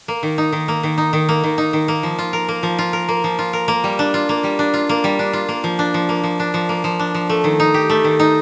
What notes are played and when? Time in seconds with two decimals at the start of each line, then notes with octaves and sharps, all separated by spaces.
0.08 A#3
0.23 D#3
0.38 D#4
0.52 D#3
0.68 A#3
0.83 D#3
0.98 D#4
1.13 D#3
1.29 A#3
1.44 D#3
1.58 D#4
1.73 D#3
1.88 A#3
2.03 F3
2.18 F4
2.33 A#4
2.49 A#3
2.63 F3
2.78 F4
2.93 A#4
3.09 A#3
3.24 F3
3.39 F4
3.53 A#4
3.68 A#3
3.84 G3
3.99 D4
4.14 F4
4.29 A#3
4.44 G3
4.59 D4
4.74 F4
4.89 A#3
5.04 G3
5.19 D4
5.33 F4
5.49 A#3
5.64 F3
5.79 D4
5.94 F3
6.09 A#3
6.23 F3
6.40 D4
6.54 F3
6.69 A#3
6.84 F3
6.99 D4
7.14 F3
7.29 A3
7.44 D#3
7.60 D#4
7.74 G4
7.90 A3
8.04 D#3
8.19 D#4